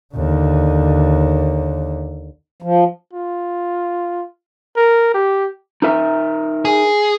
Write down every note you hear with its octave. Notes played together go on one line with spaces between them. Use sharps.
D#2 D3
F3
F4
A#4
G4
D#4 A#4 E5
G#4